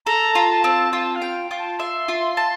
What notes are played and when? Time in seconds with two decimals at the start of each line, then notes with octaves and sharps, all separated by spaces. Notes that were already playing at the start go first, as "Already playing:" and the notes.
0.06 A4 A#5
0.35 F4
0.49 A5
0.64 C4
0.93 F4 A5
1.15 F5
1.22 G5
1.51 F4
1.58 A5
1.79 E5 C6
2.08 F4
2.37 A5